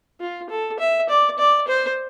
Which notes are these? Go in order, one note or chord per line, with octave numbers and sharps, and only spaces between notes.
F4
A4
E5
D5
D5
C5